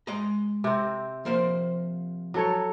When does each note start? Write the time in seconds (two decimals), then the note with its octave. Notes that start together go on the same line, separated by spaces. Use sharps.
0.07 G#3 D#5 A#5
0.64 C3 C4
1.25 F3 A#3 C5
2.34 F#3 A4 C#5